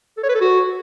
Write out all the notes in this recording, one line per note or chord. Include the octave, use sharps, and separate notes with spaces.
A4
C#5
B4
A4
F#4